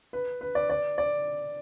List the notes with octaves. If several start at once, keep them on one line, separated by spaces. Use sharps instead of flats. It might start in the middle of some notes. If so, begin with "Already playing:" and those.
B4
B4
D5
D5
D5